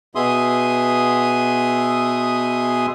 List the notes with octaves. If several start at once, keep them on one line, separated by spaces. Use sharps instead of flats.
B2 B3 G#4 E5 C6 D#6